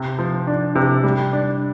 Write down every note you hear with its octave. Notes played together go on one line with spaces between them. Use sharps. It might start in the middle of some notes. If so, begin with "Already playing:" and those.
Already playing: C3
F3
D4
C3
G3
D4